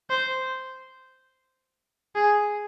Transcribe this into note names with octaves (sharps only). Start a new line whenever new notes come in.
C5
G#4